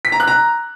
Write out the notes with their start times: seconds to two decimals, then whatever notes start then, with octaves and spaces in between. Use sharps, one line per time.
0.05 B6
0.12 A#5
0.20 F#6
0.28 A#5